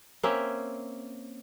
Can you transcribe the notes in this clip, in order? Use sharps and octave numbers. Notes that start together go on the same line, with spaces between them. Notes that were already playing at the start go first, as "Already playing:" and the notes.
A#3 C4 C#4 E5